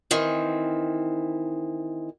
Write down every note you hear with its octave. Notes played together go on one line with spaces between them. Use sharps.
D#3 E3 C4